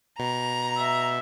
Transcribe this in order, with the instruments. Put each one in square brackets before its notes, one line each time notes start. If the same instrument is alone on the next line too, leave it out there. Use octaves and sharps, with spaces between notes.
[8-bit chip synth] B2 [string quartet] A#5
[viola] E5